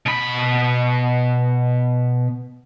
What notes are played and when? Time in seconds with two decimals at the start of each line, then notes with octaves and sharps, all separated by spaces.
0.06 B2 B5